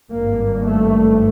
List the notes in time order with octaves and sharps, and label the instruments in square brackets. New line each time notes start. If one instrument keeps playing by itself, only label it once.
[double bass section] G#1 G2 A#3
A3